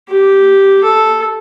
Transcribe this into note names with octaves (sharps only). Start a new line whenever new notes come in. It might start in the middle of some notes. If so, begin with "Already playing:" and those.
G4
A4